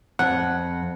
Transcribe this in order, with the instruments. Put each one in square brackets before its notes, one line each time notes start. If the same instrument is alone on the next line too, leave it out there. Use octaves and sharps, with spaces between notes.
[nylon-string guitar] F2 [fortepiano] F#5